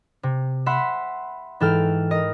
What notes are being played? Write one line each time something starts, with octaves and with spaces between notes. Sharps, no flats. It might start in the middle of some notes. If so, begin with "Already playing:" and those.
C3
E5 F#5 B5 C6
G#2 E3 A4 G5 F6
A#4 D#5